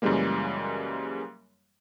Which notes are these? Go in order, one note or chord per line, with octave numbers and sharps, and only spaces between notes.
F#2 C#3 E3 G3 G#3 A#3